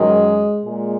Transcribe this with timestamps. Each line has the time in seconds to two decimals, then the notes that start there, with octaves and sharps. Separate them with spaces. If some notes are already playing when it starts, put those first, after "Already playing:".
Already playing: F#2 D#3 G#3
0.63 A#2 G#3